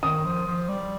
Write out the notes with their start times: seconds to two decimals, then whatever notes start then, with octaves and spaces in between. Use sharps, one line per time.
0.03 D#3 D#6
0.25 F3
0.47 F3
0.69 G3